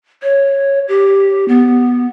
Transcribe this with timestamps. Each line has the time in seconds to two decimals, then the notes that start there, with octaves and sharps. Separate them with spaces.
0.23 C#5
0.88 G4
1.48 B3